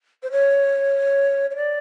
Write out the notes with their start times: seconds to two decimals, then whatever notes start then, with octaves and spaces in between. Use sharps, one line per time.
0.22 C5
0.31 C#5
1.50 C#5
1.56 D5